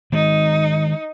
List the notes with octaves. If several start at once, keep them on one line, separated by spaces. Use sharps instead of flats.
D#3 G#3 D#4